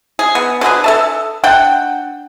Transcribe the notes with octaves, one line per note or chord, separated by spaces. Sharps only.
G#4
B3
D3 F#3 G#4 B4
A4 E5 A5
D4 F#5 G5